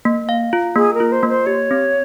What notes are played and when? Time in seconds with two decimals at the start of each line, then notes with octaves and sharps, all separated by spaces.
0.05 A#3
0.29 F5
0.53 F4
0.75 A#3 G#4
0.94 A#4
1.00 F4
1.12 C5
1.23 A#3
1.29 C5
1.46 G4 C#5
1.71 C4